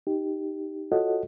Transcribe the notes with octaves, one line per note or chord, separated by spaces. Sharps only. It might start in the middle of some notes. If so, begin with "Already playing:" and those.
D#4 G4
F4 F#4 A4 C#5 D#5 F#5